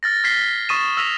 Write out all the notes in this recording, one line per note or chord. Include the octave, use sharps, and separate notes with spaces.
F6 A6 A#6
F6 G#6 A6 B6 C7 G7
C#6 D#6 A6 B6 D#7 E7
E6 F6 A#6 B6 D#7 F7